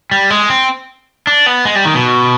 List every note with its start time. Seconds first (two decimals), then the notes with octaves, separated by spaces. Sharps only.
0.11 G3
0.30 G#3
0.50 C4
1.27 D4
1.46 B3
1.65 G#3
1.75 G3
1.85 D#3
1.95 B2